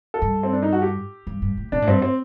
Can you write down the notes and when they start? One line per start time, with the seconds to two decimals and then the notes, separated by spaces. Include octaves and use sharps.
0.14 A4
0.22 G2
0.43 C4
0.53 D4
0.63 D#4
0.73 F#4
0.82 G4
1.27 G2
1.42 G2
1.57 A2
1.72 A#2 D4
1.82 A2
1.87 G2 C4
2.02 C4